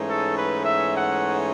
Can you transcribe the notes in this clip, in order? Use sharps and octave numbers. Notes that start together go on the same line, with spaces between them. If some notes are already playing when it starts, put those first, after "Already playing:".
Already playing: G#2 E3 A3 C#4
A4
B4
E5
F#5